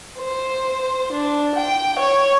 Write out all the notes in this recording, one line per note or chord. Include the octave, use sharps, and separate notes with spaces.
C5
D4
G5
C#5